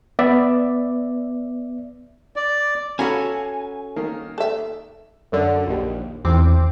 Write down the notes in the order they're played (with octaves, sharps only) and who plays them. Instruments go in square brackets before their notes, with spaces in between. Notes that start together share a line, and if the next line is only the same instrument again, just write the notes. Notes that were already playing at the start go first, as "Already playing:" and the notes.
[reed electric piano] B3 D5 E5
[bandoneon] D5
[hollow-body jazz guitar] C#4 F#4 A4 [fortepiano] F5 A#5 B5 [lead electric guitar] G#5
[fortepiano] D#3 A#3
[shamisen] A4 E5
[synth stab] F#2 D3
A#1 D#2
[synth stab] A1 C4 D6 [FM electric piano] E2 D#3 E3